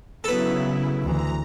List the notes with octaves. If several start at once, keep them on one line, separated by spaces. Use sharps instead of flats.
C#3 F#3 B3 E4 A4 B4
D2 E3 A#5